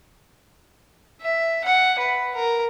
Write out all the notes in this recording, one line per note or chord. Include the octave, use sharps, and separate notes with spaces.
E5
F#5
B4
A#4